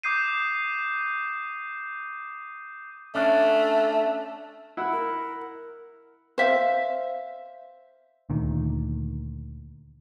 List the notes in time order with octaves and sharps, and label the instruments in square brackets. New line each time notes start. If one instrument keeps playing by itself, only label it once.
[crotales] D6 D#6 G6 C7 D#7
[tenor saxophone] A3 [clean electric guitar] C#4 D4
[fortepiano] E4 F#5
[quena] A#4
[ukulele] C5 E5 F5
[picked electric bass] D2 A#2 D#3